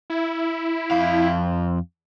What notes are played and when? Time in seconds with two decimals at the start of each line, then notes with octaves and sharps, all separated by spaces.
0.10 E4
0.91 F2 F5